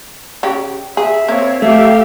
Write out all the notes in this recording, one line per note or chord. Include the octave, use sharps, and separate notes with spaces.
C#3 G4
G#4 E5
A#3 C4 C#5
A3 G4 E5 F5